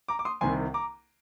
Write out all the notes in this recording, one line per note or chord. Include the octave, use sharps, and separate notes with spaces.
A#5 D6
D6
C6 D#6
C2 C3 D#3 G#5 C6
A#5 D6